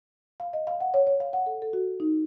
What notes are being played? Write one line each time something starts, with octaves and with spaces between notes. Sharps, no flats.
F5
D#5
F5
F#5
C#5
C#5
F5
F#5
A4
A4
F#4
D#4